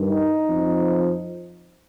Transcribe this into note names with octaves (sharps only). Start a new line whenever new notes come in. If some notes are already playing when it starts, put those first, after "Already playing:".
Already playing: G2 D#3
D#4
F2 F3